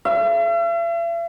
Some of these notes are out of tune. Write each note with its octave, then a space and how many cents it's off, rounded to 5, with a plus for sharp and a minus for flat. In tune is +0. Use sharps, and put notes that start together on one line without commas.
E5 +45